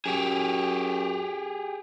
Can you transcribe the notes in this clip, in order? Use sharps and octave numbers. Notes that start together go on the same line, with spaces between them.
F#2 G4 G#4